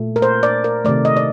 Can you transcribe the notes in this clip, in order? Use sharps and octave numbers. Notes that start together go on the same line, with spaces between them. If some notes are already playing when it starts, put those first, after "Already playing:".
Already playing: A#2 A3
A#4
C5
D5
A#4
C3 D#3 A3 D5
D#5
D5